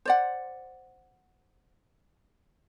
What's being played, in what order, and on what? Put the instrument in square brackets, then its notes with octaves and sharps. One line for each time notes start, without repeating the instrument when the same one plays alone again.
[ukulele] C5 D5 F#5